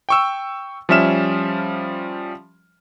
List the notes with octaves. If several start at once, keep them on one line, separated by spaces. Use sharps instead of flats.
G5 C#6 E6
F3 G3 C#4 E5 F6 E7